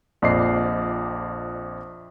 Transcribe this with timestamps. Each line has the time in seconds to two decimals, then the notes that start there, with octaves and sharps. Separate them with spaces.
0.22 A#1 F2 D5 D#5 C7